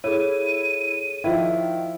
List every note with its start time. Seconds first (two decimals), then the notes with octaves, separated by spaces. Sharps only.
0.04 E4 G#4 A4 C#5 D#7
1.24 D#3 F3 E4